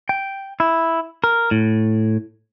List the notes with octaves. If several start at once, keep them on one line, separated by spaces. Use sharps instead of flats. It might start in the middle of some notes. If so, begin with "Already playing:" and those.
G5
E4
A#4
A2